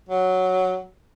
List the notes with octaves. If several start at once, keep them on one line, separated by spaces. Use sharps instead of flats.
F#3